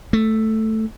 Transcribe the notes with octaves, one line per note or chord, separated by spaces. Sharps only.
A3